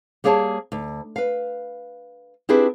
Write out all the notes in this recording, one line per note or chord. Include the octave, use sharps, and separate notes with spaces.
G3 A#3 G#4 C#5 G#5 A5
D2
B4 F5
C4 D4 E4 G4 G#4 B4